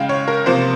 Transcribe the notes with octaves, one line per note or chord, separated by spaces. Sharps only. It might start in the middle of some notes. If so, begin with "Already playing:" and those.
Already playing: C#3 G#3 F5 G5
C#5
A#4
C3 F3 A#3 C5